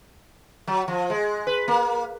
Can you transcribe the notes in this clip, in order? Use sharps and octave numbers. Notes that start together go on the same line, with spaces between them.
F#3
F3
G#3
B4
A#3